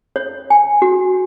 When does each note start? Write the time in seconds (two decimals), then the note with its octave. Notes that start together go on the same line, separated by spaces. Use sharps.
0.16 C#5
0.50 G#5
0.82 F#4